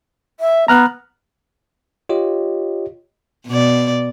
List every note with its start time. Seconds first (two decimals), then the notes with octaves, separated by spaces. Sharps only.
0.40 E5
0.68 B3 A#5 F6 F#6
2.09 F4 G4 C#5 D#5
3.47 B2 D5